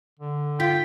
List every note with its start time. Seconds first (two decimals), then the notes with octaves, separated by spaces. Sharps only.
0.19 D3
0.60 F4 G5 B6